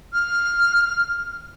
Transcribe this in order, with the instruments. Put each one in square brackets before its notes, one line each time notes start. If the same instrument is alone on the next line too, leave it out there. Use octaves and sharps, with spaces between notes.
[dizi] F6